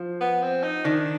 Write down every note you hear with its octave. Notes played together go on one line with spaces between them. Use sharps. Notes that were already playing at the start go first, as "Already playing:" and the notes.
Already playing: F3
B3
C4
D#4
D#3 D4